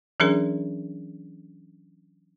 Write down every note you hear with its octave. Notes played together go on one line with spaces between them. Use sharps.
E3 F#3 C#4 D4 G#4 A#4